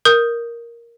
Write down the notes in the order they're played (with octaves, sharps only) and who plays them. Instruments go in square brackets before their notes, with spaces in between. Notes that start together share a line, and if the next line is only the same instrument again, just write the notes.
[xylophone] A#4 D#6 G6